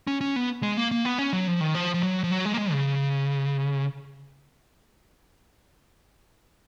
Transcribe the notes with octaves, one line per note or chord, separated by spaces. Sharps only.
C#4
C#4
B3
G#3
A#3
A#3
B3
C#4
F#3
F3
D#3
F3
F3
F#3
F3
F#3
G#3
A#3
G#3
C#3